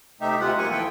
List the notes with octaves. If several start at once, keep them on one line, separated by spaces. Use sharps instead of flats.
C3 A3 D#4 G4 E5
D2 C3 G#3 F4 F#5
F#3 A#3 G#5 C#6
E3 F3 A4 B4 G5